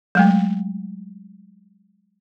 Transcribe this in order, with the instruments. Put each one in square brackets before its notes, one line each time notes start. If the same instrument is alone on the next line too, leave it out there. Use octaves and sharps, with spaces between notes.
[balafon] F#3 G#3 A3